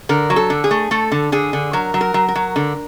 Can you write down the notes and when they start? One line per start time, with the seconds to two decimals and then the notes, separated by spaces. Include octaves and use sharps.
0.09 D3 A#4
0.30 F#3
0.36 A4
0.50 D3
0.64 G#4
0.71 A3
0.91 A3 A4
1.12 D3
1.32 D3 G#4
1.53 D3
1.73 F#3 A#4
1.94 F#3
2.01 A#4
2.14 F#3
2.28 A#4
2.35 F#3
2.56 D3